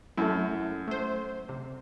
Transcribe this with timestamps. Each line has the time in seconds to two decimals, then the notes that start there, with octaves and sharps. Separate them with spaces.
0.18 F#2 A3 E4
0.88 A3 C5
1.49 C3